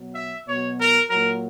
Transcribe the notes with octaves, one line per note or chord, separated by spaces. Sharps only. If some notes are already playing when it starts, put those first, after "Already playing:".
Already playing: B2 F#3
E5
B2 F#3 C#5
A#4
A#2 F#3 A#4